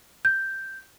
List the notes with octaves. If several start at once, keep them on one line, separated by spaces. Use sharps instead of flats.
G6